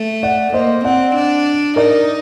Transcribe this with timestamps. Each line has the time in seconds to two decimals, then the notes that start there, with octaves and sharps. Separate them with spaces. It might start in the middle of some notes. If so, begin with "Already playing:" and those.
Already playing: A3
0.23 D5 F#5
0.53 A#3 C5 D#5
0.84 C4 D5 F#5
1.15 D4
1.76 D#4 A#4 D5